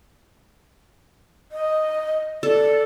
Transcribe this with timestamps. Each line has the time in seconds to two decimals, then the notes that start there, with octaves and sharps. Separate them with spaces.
1.52 D#5
2.43 A4 D5